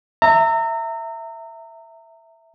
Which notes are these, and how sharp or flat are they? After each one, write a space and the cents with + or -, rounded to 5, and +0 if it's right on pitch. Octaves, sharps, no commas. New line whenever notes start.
E5 +0 A#5 -30